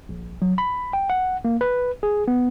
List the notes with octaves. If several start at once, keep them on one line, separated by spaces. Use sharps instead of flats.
A#1
F#3
B5
G5
F#5
A#3
B4
G#4
B3